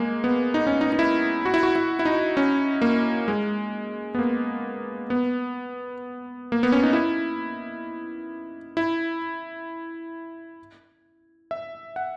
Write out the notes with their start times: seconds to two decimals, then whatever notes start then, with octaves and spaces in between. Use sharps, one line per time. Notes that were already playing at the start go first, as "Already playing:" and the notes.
Already playing: G#3 A#3
0.24 B3
0.54 D#4
0.67 C#4
0.81 D#4
0.93 D#4
0.99 E4
1.45 F#4
1.54 E4
1.63 F#4
1.76 E4
1.99 E4
2.05 D#4
2.37 C#4
2.82 A#3
3.28 G#3
4.15 B3
4.19 A#3
5.10 B3
6.52 A#3
6.63 B3
6.72 C#4
6.83 D#4
6.93 E4
8.77 E4
11.51 E5
11.96 F#5